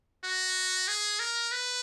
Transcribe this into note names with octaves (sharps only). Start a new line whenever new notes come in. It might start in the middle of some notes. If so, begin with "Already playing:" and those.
F#4
G#4
A#4
B4